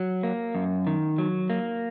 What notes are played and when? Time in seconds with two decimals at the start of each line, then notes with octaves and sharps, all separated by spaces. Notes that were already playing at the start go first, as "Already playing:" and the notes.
Already playing: F#3
0.23 A#3
0.55 F#2
0.87 D#3
1.18 F#3
1.50 A#3